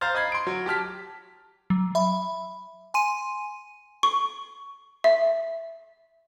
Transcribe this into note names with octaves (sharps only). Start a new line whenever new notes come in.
C5 F5 A#5 F6 A6
D#5 B5 G#6 C7
C6 D7
F#3
G4 A5 F6 B6
F#3
E5 B5
G#5 C6 D#7
C#6
E5